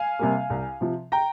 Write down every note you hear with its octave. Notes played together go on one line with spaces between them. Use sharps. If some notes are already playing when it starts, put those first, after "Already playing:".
Already playing: F5 G#5
C3 G3 A#3
C2
C3 F3
G5 A#5